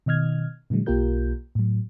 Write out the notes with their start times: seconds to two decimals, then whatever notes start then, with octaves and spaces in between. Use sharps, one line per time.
0.06 B2 D#3 D#5 F6 G#6
0.70 A#2 D3 E3 F#3 G#3
0.86 B1 A#3 F4 G4 A#4 G6
1.55 A2 F#3